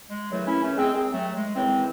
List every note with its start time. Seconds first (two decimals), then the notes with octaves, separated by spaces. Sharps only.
0.10 G#3
0.31 D#2 C#3 E3 F#3 A3
0.46 C#4 E4
0.61 A3 C#4
0.77 G#3 C4
0.93 D#2 D#3 G#3 C4
1.13 F#3 A3
1.34 G#3
1.55 D#2 C#3 E3 G#3 C4